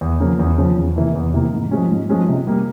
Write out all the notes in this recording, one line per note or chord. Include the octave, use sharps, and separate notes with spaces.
E2
C#3 F3 A#3
E2
C#3 F3 A#3
E2
C3 E3 A#3 E4
E2
C3 E3 A#3 E4
G#2
F3 G#3 C#4
G#2
F3 G#3 C#4
C3
G3 A#3